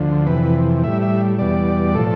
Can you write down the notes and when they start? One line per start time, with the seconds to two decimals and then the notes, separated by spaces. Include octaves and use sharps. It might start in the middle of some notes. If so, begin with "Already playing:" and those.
Already playing: D2 D3 F3
0.27 F2 C3 E3 B4
0.84 A2 G3 E5
1.02 E5
1.39 E2 B2 G3 D5
1.95 A2 F3 A4